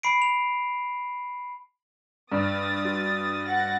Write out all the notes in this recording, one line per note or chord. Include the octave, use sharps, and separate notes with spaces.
B5 C7 D7
F7
G2 D#6 A6
F#4
F#5 A6 A#6